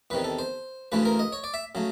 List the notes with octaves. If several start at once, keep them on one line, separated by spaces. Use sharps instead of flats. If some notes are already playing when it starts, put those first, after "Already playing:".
E2 C3 D#3 B4
A4
C5
D2 C#3 E3 A3 B4
A#4
D#5
C#5
D5
E5
C#3 F#3 A3